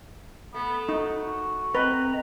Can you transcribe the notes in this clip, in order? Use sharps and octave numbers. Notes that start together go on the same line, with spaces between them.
A3 B3
D#4 F#4
C4 B4 D#5 A#5